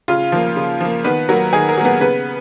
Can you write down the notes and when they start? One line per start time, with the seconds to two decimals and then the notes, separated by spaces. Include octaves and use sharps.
0.08 C#3 F4 F5
0.32 F3 A#3
0.56 C#3
0.80 F3 A#3
1.04 D#3 B3 B4
1.29 F#3 A#3 A#4
1.53 D#3 G#4
1.69 A#4
1.77 F#3 A#3
1.85 B3 B4
2.01 C#3 B3 B4